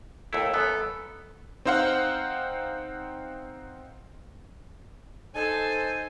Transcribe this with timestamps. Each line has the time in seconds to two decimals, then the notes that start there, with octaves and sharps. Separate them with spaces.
0.33 D#2 A3 E4
0.54 F#2 B3 A4
1.65 C4 D#4 C5 F5 F#5
5.35 D#4 A4 C5 G#5